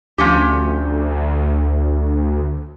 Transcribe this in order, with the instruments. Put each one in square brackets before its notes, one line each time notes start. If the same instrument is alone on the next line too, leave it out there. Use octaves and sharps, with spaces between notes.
[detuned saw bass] D2 [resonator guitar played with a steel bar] F3 C#4 G4